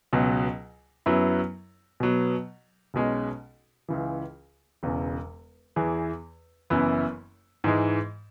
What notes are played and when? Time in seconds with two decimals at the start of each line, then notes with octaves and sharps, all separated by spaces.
0.13 C#2 B2 F#3
1.06 F#2 F#3 B3 E4
2.00 B2 F#3 B3
2.94 B1 B2 G#3 C#4
3.89 C#2 C#3 E3
4.83 E1 E2 C#3
5.76 E2 E3 B3 G#4
6.70 F#1 F#2 E3 B3 E4
7.64 G#2 E3 G#3